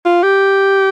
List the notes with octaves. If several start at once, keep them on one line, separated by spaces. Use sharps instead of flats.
F4
G4